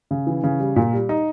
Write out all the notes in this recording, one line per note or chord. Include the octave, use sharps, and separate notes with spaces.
C#3
E3
C#3
G3
A#2
G3
D#4